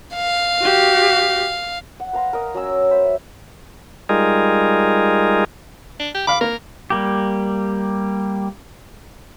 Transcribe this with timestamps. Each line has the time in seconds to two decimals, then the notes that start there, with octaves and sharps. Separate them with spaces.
0.15 F5
0.61 F#4 G4
2.00 F#5
2.13 B4 F5 A#5 C6
2.33 A#4 D#5
2.54 F#3 C#4 E6
2.91 C5 E5 B5
4.09 G3 G#3 D#4 F4 G#4 A#4
6.00 D4
6.15 G4
6.27 F5 B5 D6
6.41 A#3 A#4
6.90 G3 A#3 G4